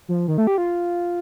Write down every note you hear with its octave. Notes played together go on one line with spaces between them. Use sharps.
F3
D#3
A3
G4
F4